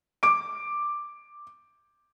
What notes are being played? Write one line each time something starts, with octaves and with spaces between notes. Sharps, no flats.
D6 D7